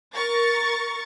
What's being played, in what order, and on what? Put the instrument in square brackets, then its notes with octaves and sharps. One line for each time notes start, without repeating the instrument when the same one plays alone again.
[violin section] A#4 C#6 A6